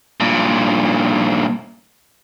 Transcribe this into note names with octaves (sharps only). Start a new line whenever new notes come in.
G2 A#2